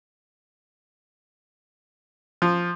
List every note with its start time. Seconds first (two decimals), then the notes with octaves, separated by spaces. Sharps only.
2.42 F3